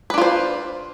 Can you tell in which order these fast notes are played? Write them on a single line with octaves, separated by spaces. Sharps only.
B4 D4 F4 C5